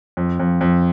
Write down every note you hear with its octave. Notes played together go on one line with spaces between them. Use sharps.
F2
F2
F2